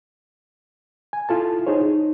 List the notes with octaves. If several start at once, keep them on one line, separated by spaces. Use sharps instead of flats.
G#5
E4 F4 A4 A5
D#4 G#4 C5 C#5
D#4